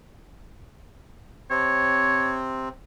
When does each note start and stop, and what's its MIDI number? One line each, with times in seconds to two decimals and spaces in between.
1.50 2.69 48
1.50 2.69 60
1.50 2.38 73